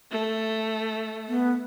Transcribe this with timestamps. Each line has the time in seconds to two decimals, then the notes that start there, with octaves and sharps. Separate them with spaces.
0.11 A3
1.28 B3